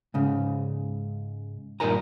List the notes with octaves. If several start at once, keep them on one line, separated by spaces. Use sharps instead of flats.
G#2 C#3
G2 A#2 D#4 A#4 G#5 A#5